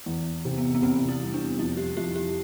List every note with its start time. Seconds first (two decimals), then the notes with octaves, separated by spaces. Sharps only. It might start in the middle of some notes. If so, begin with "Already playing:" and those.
0.06 E2
0.45 C3
0.58 B3
0.74 B3
0.82 C3 C4
1.08 E4
1.21 G3
1.34 D4
1.59 F2 E4
1.77 G4
1.97 F2 G4
2.16 G4